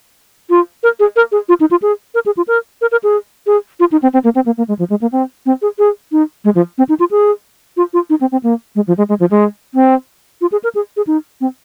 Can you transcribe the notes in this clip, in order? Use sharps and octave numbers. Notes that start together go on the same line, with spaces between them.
F4
A#4
G#4
A#4
G#4
F4
D#4
F4
G#4
A#4
G#4
F4
A#4
A#4
A#4
G#4
G#4
F4
D#4
C4
C4
A#3
C4
A#3
A#3
G#3
F3
G#3
A#3
C4
C4
G#4
G#4
D#4
G#3
F3
C4
D#4
F4
G#4
F4
F4
D#4
C4
C4
A#3
G#3
F3
G#3
G#3
F3
G#3
C4
F4
G#4
A#4
G#4
G#4
D#4
C4